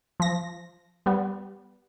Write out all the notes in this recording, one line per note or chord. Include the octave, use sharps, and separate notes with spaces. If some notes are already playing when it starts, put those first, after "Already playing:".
F3 A#6
G3 B3